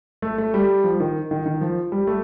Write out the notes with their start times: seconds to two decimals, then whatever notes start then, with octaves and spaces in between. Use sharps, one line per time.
0.22 A3
0.38 A3
0.54 G3
0.84 F3
1.00 D#3
1.31 D#3
1.46 D#3
1.61 F3
1.92 G3
2.07 A3